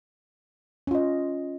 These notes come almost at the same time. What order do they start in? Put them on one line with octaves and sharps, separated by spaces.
C#4 F4 D#5